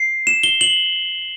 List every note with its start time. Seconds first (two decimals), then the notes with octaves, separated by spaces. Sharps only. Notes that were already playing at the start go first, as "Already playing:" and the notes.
Already playing: C7
0.27 E7
0.43 G7
0.61 F#7